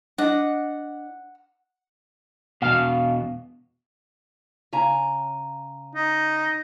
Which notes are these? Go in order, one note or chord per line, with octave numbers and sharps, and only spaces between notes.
D4 D#5 F#5
E2 B2 F5
C#3 G#5 A#5
D#4